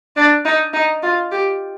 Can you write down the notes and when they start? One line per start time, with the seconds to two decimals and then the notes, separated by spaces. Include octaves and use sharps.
0.16 D4
0.45 D#4
0.73 D#4
1.03 F4
1.31 G4